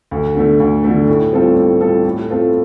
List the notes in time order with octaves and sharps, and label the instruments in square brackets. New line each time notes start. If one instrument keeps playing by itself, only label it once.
[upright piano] D2
D3 A3
D2
D3 A3
A2
G3 C4 F4 A4
A2
G3 C4 F4 A4
A2
A3 C4 F4 A4